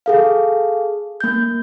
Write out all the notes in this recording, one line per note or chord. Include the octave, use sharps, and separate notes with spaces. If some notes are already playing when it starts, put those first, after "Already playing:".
G#4 A4 F5
A#3 G6